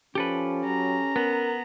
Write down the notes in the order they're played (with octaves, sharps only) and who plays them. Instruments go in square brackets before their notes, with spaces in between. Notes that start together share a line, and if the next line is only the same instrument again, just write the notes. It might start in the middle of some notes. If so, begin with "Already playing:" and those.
[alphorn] F3 [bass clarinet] C#4 [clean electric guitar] G4 A4 B4
[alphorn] F#3 [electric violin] A#5
[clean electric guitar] B3 [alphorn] A#4